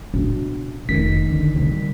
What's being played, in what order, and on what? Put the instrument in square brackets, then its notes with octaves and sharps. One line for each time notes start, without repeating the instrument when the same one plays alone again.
[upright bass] B2 D4
[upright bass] F1 C3 [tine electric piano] D#3 B6
[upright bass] D3
C3 G3